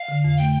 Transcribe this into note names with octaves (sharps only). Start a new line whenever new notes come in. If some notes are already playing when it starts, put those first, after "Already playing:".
Already playing: F5
D3
F2
A3 G5